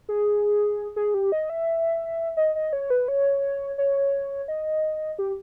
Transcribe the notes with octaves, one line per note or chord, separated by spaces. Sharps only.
G#4
G#4
G4
D#5
E5
D#5
D#5
C#5
B4
C#5
C#5
D#5
G4